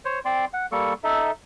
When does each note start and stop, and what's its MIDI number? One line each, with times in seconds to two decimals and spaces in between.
0.05 0.19 72
0.05 0.19 73
0.25 0.45 60
0.25 0.45 74
0.25 0.45 84
0.54 0.66 78
0.72 0.94 55
0.72 0.94 58
0.72 0.94 69
0.72 0.94 85
1.04 1.31 63
1.04 1.31 69
1.04 1.31 76